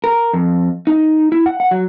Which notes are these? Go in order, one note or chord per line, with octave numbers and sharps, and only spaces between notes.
A#4
F2
D#4
E4
F#5
F#5
F#3